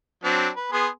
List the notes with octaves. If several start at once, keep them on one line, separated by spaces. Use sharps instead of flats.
F#3 C4 D4
B4
B3 G#4 C6